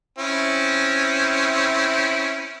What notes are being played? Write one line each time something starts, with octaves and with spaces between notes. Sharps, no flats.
C4 C#4 E4